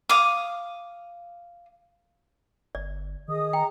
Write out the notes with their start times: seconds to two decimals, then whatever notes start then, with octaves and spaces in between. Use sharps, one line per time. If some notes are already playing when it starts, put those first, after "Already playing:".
0.09 F5 D6 D#6
2.75 G1 D5
3.28 D#3 G#4 D#5 D#6
3.53 G5 A#5